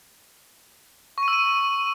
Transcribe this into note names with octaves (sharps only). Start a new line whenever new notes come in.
C#6
D#7
E6
D#7